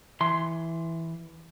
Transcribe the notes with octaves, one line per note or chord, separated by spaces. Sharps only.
E3 C6